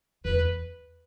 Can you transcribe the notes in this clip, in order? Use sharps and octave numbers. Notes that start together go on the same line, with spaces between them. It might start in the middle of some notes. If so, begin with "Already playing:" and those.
E2 B4